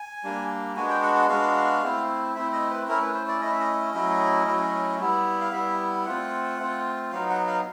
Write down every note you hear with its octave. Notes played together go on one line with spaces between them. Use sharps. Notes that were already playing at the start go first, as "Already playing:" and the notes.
Already playing: G#5
G3 A#3 D4
G#3 B3 D4 F#4 G#5
G5
F#5
F#5
G#3 B3 D4 F#4 F5
A3 C4 E4
A3 C4 E4 E5
D#5
B4
A3 C#4 E4 A#4
B4
C5
D5
A3 C#4 E4 D#5
E5
D#5
F#3 A3 C#4 E4
F#3 A3 C#4 E4
G3 B3 E4
F5
G3 B3 E4 E5
A3 C4 F4 F#5
A3 C4 F4
F#3 B3 D#4 F5
F#5
F5